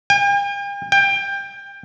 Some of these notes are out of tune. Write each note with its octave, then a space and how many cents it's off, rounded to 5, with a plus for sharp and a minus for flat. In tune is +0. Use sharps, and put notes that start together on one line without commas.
G5 +45
G5 +20